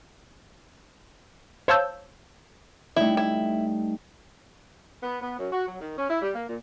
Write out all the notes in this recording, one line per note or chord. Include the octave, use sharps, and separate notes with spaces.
C5 C#5 F5 A5 E6 G6
G3 A3 D#4 E4
E4
B3
B3
F#2
F#4
F#3
D#3
C#4
E4
G3
A#3
A#2